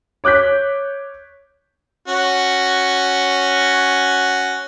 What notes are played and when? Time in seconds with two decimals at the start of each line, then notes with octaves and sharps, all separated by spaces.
0.24 C#5 D6 F#6 G6 B6
2.08 C#4 F#4